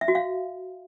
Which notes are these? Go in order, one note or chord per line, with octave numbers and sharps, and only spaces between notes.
E5
F#4
F5